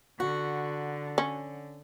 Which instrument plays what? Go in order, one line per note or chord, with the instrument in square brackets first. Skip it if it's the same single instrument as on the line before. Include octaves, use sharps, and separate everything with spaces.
[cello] D3 [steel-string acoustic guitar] F#4
[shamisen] C#4